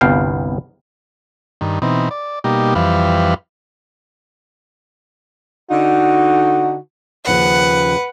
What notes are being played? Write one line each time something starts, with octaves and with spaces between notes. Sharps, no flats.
G1 C2 B3 F5 G5
G2 D#3
B2 E3 C4 D#4
D5
B2 G3 A#3 D#4 G4
F2 E3 G3 B4 F5
D3 D#4 F#4
D#2 C#3 F3 B4 F#5